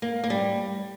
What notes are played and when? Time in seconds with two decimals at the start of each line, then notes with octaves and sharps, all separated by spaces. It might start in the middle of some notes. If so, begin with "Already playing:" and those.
0.02 A#3
0.24 A#3
0.30 G3